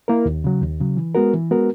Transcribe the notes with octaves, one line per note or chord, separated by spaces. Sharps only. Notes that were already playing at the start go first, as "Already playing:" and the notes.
A#3 E4 A#4
D#2
C#3 F#3
D#2
C#3 F#3
E3
G#3 B3 F#4 A#4
E3
G#3 B3 F#4 A#4